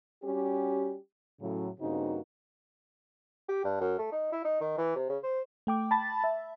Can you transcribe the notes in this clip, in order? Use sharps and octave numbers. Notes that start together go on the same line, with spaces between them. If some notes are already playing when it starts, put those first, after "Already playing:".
G3 C#4 F#4 G4
A2 C#3 F#3
G2 C#3 A#3 C4 D#4 F#4
G4
G2
F#2
A3
D#4
E4
D#4
D#3
E3
C3
C#3
C5
A3 G5 D6
A5 B5 A6
E5